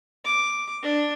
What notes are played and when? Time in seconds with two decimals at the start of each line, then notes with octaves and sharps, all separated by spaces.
0.25 D6
0.83 D4